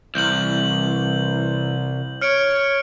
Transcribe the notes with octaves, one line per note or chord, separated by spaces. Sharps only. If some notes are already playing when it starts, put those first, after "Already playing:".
C2 E3 G6 F#7
C#5 F6 C#7 D7